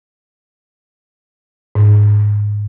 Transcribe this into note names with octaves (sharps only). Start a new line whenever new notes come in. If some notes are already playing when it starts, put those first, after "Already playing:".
G#2